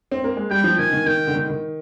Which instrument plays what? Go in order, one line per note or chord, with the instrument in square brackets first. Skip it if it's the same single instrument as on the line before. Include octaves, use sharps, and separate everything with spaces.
[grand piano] C4
A#3
G#3
[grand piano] G3 [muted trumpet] G5
[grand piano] F3
[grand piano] D#3 [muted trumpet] G#5
[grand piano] D#3
[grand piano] D#3 [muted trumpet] G5
[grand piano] D3
D#3
D#3